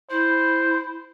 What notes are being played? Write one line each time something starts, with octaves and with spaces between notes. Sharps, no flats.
E4 C5